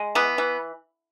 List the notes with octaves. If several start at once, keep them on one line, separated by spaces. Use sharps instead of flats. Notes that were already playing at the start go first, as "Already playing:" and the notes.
Already playing: G#3
E3 B3
E3